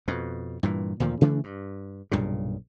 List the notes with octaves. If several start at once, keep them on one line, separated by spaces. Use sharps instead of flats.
F2 B2
G2 A#2 E3
D2 A#2 D#3 F3
C#3 E3 A3 D4
G2
B1 G2 A#2 C#3